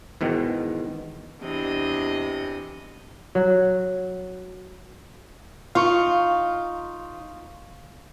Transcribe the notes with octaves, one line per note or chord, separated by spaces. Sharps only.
E2 G#2 B2 D#3
E2 C3 D4 D#5
F#3
D#4 F4 F5 C#6